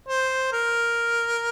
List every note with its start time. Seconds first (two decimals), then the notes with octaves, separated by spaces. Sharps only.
0.08 C5
0.52 A#4